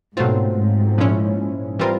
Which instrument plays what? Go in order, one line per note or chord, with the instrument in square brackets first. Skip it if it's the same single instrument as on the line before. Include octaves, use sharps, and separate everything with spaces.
[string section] G#2 [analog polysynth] B2 F#3 A3 C4 F4
[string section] G#2
[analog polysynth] A#2 F3 G#3 C#4 E4
E3 G3 C4 F4 A#4